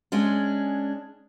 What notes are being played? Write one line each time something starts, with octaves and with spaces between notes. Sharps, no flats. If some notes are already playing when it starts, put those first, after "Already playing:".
G#3 C#4 D4